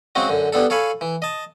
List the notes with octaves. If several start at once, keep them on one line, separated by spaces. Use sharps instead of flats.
C#3 F#3 G#3 C4 C#4 F#4
F#2 D3
G3 B3 D4 A4
A4 C#5 F5 G#5 B5
E3
D#5 A5